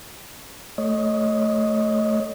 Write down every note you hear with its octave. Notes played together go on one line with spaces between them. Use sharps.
A3 C#5 D#5